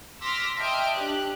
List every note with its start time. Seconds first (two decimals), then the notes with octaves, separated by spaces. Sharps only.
0.21 C6 D6 E6 F6 A#6 B6
0.57 D#5 E5 G5 A5 F6 D7
0.94 D4 G4 F#6